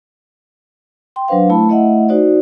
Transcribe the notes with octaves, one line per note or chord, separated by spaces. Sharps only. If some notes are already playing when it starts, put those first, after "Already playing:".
G5 C6
F#3 D4 B4 C5 F5
A3 E4 A5 B5
A3 E4 D#5 E5 F#5
D#4 F#4 C5 D5